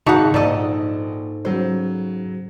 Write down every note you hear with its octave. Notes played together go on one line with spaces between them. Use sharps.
G#1 C#3 D#4 F#4 E5 F#5 A5 C#6
A#1 G#2 D#4 A4 D5 D#5
C#3 F#3 C5